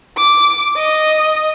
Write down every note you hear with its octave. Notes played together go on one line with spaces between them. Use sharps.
D6
D#5